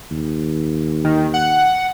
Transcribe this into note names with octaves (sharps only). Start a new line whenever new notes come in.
D#2
D#3
F#5